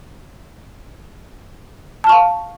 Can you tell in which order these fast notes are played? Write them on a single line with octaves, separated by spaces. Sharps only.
A5 F6 C#6 F5